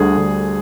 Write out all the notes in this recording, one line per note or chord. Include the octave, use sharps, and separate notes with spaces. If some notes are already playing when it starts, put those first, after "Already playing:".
Already playing: D2 D3 G3 G#4
D2